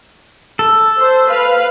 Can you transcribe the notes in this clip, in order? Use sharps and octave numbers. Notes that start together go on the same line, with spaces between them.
A4
C5
B4 F5